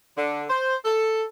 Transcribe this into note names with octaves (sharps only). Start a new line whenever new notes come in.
D3
C5
A4